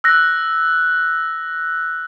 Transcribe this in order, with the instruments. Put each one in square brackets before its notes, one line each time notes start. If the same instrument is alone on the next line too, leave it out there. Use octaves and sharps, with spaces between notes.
[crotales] E6 F#6 A#6